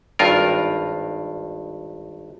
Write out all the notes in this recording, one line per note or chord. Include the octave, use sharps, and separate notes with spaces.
G#1 G2 F4 A#4